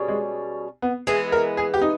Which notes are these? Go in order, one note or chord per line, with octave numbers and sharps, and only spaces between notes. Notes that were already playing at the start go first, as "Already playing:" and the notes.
Already playing: B2 G3 C#4 G#4
G#3
B3
E3 G#3 B3 G#4
A#4
G#4
G4
D#4